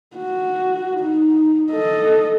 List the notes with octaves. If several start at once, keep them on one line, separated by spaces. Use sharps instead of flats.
F#4
D#4
A4 D#5